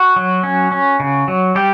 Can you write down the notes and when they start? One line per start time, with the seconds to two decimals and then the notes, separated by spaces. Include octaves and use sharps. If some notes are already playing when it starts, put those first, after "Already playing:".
Already playing: F#4
0.16 F#3
0.43 C#4
0.72 C#4
1.00 C#3
1.28 F#3
1.55 G3 G4